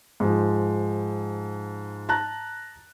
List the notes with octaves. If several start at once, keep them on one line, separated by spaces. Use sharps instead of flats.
G#2 F3
A5 A#5 F#6